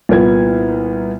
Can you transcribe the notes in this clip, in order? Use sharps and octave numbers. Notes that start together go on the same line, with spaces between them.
C2 A#2 B3 G#6